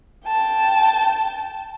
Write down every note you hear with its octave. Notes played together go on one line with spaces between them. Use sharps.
G5 A5